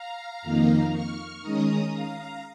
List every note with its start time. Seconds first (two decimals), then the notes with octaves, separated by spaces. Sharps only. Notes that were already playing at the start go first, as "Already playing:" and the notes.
Already playing: F5 A#5
0.42 F2 D#3 A#3 D#4
0.92 C#6 F6
1.42 D#3 G#3 C#4 A#5 D#6
1.92 F5 A#5